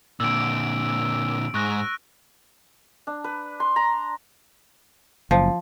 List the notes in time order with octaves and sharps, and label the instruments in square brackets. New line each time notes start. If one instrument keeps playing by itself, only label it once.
[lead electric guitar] A#2 D3 [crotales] E6 D7
[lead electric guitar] G#2 [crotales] C#6 F#6 A#6
[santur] D4
B4
C6
A#5
[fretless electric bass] F#1 [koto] F3